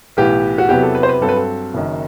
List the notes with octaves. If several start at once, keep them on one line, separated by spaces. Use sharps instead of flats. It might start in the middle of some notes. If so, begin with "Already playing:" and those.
B1 A2 E3 B3 G4
F#4
E2 C3 F#3 B3 G4
A4
B4
C5
B4
G2 F#3 C4 A4
B4
A4
F#1 F#2 D#3